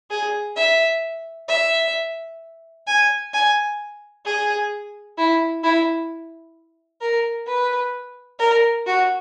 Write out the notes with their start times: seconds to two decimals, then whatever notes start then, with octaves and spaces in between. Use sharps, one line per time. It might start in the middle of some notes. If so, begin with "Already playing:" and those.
0.10 G#4
0.56 E5
1.48 E5
2.87 G#5
3.33 G#5
4.25 G#4
5.18 E4
5.63 E4
7.01 A#4
7.47 B4
8.39 A#4
8.86 F#4